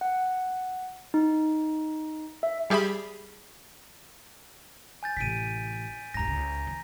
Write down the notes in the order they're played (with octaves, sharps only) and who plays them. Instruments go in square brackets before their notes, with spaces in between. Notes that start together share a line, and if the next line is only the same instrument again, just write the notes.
[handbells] F#5
D#4
E5
[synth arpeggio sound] G3 G4 G#4 E5 B5
[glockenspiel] G#5 G6 A6
[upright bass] A1 C3 [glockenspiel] B6 D7 D#7
[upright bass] D#2 G#2 [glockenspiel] A#5 A#6
[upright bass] C#2
D#3